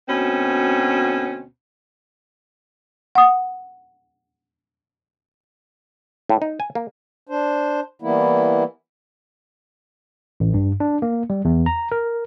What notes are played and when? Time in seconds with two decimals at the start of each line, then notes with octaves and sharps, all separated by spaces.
0.08 D2 B2 C4 C#4
3.15 F#5 D#6
6.29 A2
6.42 D#4
6.60 G#5
6.75 A#3
7.29 D4 C5
8.02 E3 G3 A#3 B3 E4
10.40 A1
10.54 G2
10.80 D4
11.02 A#3
11.30 G3
11.45 E2
11.66 A#5
11.92 A#4